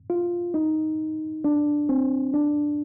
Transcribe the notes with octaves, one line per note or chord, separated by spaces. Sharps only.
F4
D#4
D4
C4
D4